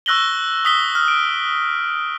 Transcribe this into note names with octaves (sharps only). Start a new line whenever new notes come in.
C#6 E6 F#6 A#6 F#7 G7
D#6 B6 G7
F6
D7